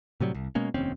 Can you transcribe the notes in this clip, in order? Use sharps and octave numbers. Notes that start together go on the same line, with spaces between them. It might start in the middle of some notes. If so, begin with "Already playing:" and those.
A2 C3 F#3 G3
C2
B2 G#3 A#3 C#4
F1 D#2 C4 C#4